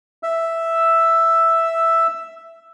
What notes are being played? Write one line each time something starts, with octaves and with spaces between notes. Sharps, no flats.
E5 E6